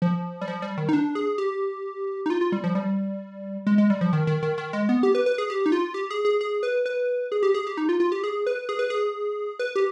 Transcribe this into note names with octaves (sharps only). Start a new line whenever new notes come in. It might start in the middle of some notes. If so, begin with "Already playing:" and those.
F3
G3
F3
G3
D#3
D#4
D4
G#4
G4
D#4
F4
F4
G3
F3
G3
G#3
G#3
G3
F3
D#3
D#3
D#3
D#3
G#3
B3
G4
B4
B4
G#4
G4
D#4
F4
G4
G#4
G#4
G#4
B4
B4
G#4
G4
G#4
G4
D#4
F4
F4
G4
G#4
B4
G#4
B4
G#4
B4
G4